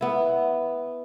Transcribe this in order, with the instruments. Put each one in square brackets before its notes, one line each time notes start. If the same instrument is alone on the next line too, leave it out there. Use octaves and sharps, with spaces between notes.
[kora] B3 E4